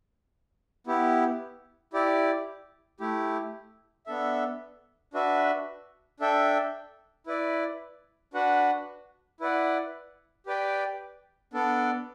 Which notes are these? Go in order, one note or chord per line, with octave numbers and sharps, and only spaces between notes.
B3 E4 G4
E4 G4 D5
A3 E4 G4
B3 D4 A4 E5
D4 F#4 B4 E5
D4 A4 E5 G5
E4 B4 D5
D4 F#4 B4 F#5
E4 B4 D5 F#5
G4 B4 D5 G5
B3 D4 A4 D5